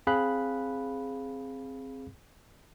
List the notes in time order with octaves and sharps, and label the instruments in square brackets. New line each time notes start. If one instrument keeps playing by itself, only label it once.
[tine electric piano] C4 G#4 F5 B5 F#6